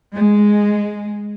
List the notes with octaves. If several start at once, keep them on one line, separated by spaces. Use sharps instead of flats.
G#3